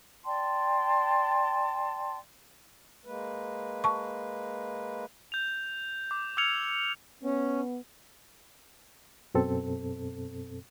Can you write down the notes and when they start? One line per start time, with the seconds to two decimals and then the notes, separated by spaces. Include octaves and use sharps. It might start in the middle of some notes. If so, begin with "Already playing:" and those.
0.25 D5 G5 A5 C6
3.05 G#3 A#3 B4
3.84 A5 C#6
5.32 G6 F7
6.11 D6
6.37 D6 E6 F6 G#6 C#7 F7
7.23 B3 C#4
9.34 F#2 B2 C4 A4